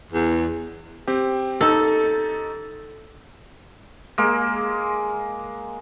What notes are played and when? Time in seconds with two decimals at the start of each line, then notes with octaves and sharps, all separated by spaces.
0.12 E2
1.08 C4 G4
1.61 D#2 D#4 A4 E6
4.18 G#3 A#3